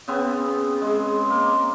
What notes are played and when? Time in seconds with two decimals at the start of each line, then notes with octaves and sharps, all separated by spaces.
0.08 C#3 B3 C4
0.82 G#3
1.30 A#3